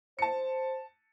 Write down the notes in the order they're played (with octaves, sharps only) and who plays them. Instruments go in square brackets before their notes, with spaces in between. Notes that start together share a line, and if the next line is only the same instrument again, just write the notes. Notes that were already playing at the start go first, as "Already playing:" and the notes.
[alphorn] C5 [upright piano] A5 C#7